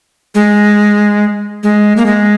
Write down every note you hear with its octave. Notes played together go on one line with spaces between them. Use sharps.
G#3
G#3
A#3
G#3